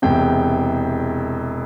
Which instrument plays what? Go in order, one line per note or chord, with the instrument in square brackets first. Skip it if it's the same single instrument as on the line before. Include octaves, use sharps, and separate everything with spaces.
[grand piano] E1 E2 C3 G5